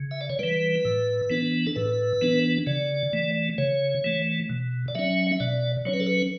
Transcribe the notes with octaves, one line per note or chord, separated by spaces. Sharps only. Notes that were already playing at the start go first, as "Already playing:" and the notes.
Already playing: C#3
E5
D5
C#5
E3 G3 B4
A2
E3 B3 D4
A4
A2 B4
E3 B3 D4
C#3 D5
E3 A3
C#3 C#5
E3 A3
B2
D5
F#3 C#4 E5
E5
B2 D5
F#3 C#4 C#5
B4
A4
B4